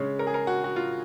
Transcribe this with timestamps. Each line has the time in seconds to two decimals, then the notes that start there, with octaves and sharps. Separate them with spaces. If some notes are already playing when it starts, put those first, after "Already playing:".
Already playing: C#3 G#3 C#4
0.19 A#4
0.27 G#4
0.34 A#4
0.47 F#4
0.64 F#4
0.76 F4